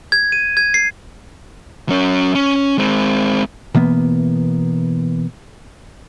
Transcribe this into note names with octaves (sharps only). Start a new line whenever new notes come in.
G#6
D#7
G#6
C7
F#3 C#4
C#4
G#3 C4
B2 E3 A#3 B3